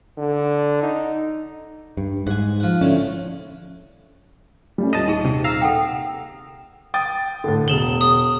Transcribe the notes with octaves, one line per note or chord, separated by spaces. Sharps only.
D3
D#4
G2
G#2 F#5 G#5
F3 F#5
A2 D3 C#4
G3 A3 C#4
D#1 D#5 A5 D#7
D#4 G#4
C3
F5 A#5 E6
A4 F#5 G5
G5 D#6 A6
A2 D3
E1 G#4 E7 F#7 G7
D#6